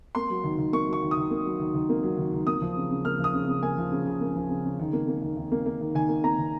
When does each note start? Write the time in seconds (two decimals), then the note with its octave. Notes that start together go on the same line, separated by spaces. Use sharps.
0.15 A#3 C6
0.30 F#3
0.44 D#3
0.58 D#3
0.73 A#3 C#6
0.88 F#3
0.93 C#6
1.03 D#3
1.11 D#6
1.17 D#3
1.31 A#3
1.46 F#3
1.60 D#3
1.74 D#3
1.89 A#3
2.03 F#3
2.18 D#3
2.33 D#3
2.47 A#3 D#6
2.62 F3
2.77 C#3
2.91 C#3
3.05 A#3 F6
3.19 F3
3.24 D#6
3.33 C#3
3.48 C#3
3.63 A#3 G#5
3.78 F3
3.92 C#3
4.06 C#3
4.21 A#3
4.36 F3
4.49 C#3
4.65 C#3
4.79 D#3
4.93 A#3
5.08 A#3
5.22 D#3
5.37 D#3
5.52 A#3
5.66 A#3
5.81 D#3
5.95 D#3 G#5
6.09 A#3
6.24 A#3 A#5
6.38 D#3